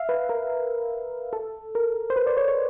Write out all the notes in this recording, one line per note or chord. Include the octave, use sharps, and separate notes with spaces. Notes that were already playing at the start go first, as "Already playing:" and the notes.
Already playing: E5 F5
B4
A#4
A4
A#4
C5
B4
D5
C#5
C#5